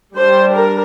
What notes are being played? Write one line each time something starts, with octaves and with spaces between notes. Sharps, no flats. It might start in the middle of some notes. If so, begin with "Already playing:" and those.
G3 D4 C5
A#4